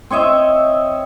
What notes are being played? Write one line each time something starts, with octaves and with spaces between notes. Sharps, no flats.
C4 C#5 D#5 E5